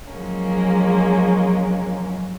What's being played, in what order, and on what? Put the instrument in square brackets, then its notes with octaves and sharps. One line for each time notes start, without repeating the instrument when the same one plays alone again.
[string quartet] F3 F#3 G#3 A#3 C#4